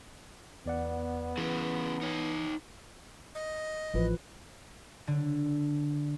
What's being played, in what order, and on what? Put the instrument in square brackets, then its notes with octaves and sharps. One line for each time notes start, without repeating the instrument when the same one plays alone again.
[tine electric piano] E2 D5 F#5 [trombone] B3
[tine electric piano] E3 [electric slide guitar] C#4 E4 G#4
[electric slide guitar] D#4 C#5
[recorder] D#5
[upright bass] A1 [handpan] E3 F3 B4
[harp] D3